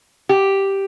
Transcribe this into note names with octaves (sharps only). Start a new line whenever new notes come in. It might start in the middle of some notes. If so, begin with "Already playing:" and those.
G4